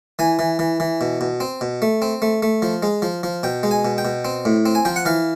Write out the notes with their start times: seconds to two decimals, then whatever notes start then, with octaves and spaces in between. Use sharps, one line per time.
0.19 E3 G#5
0.39 E3
0.59 E3
0.80 E3
1.01 B2
1.21 B2
1.40 C4
1.61 B2
1.82 A3
2.02 C4
2.22 A3
2.43 A3
2.62 F3
2.83 G#3
3.02 F3
3.23 F3
3.43 B2 G5
3.63 G#3
3.71 G#5
3.85 B2
3.98 G5
4.05 B2
4.25 C4
4.45 A2
4.66 C4
4.75 G#5
4.85 F3 G5
4.96 F#5
5.06 E3 F5